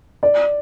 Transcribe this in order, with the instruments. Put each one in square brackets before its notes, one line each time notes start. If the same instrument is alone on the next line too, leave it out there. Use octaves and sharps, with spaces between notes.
[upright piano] D5